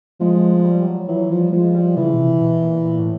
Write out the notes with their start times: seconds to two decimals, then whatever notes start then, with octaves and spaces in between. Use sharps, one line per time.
0.20 F3 G#3
0.59 G#3
0.64 G3
0.82 G3
0.87 F#3
1.08 E3 F#3
1.30 F3 G3
1.52 F3 G#3
1.74 G3
1.97 C#3 E3
2.14 B2
2.19 C3
2.40 B2
2.62 A#2
2.85 A#2
2.98 A2